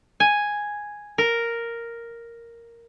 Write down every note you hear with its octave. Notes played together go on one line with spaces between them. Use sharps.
G#5
A#4